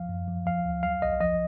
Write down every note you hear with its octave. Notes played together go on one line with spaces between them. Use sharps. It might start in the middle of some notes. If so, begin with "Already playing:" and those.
Already playing: F3 F5
F#2
F3
F3 F5
D2
F#3 F5
B1 D#5
F3 D#5